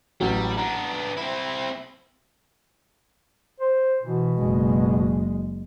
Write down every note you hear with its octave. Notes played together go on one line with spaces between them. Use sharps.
A1 F#3 G3
B3 D4 A#5
C4 E4
C5
B2 E3
F#1 G#3